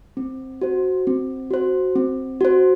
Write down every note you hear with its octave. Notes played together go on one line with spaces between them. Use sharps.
C4
F#4 C5
C4
F#4 C5
C4
F#4 C5